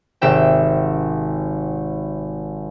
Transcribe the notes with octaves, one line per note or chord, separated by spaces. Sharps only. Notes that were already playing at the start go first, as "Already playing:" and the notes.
G#1 C3 E5 G5